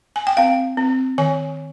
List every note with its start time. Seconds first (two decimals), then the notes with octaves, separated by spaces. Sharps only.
0.16 G#5
0.27 G5
0.37 C4 F5
0.77 C4
1.18 D#3 G#5